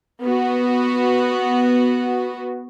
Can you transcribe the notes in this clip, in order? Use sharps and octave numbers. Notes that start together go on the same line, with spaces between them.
B3 F#4